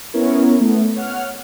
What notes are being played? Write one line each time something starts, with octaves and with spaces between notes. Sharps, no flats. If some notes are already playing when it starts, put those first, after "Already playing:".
B3 C#4 E4 A#4 C#5
A3 B3
C#5 F#5 F6